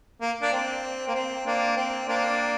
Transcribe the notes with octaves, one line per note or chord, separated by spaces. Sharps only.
A#3
A#3 D4
C4
A#3
C4
A#3 D4
C4
A#3 D4